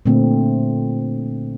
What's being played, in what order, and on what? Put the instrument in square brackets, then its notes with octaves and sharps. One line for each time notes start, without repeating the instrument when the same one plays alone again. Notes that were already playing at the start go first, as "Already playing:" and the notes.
[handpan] A#2 D3 A3 C4